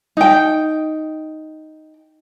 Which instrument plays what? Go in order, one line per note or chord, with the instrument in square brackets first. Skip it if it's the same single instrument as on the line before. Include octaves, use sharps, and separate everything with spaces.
[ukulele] D#4 G5